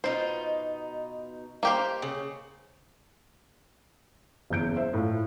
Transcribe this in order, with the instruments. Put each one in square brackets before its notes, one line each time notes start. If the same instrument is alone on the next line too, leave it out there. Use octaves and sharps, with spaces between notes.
[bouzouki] B2 D#4 F4 [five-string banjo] C5
[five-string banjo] A#3 G4 C5 [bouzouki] F5
[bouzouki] C#3
[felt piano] F#1 E2 G6 D7
C5 E5
A2 F4